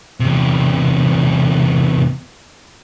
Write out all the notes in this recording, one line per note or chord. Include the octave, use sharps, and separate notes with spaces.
E2 C3